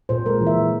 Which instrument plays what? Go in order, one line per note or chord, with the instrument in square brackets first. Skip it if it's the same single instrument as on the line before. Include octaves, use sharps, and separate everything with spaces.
[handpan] A#2 C5
G#3 A#4
E3
E5
E3